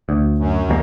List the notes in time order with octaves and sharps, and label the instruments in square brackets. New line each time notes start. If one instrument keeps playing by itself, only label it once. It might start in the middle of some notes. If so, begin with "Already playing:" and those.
[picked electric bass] D2
[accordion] F#2
[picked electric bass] D#2 G3 A#3